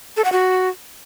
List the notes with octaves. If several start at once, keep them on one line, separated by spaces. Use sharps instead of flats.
A4
F#5
F#4